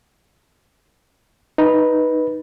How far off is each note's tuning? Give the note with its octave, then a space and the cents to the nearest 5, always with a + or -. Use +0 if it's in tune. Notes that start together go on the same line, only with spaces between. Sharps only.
D#4 +0 B4 -10